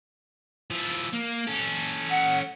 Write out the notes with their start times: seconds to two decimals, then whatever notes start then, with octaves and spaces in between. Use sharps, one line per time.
0.71 F3 E4
1.13 A#3
1.47 C#4 A4
2.10 F#5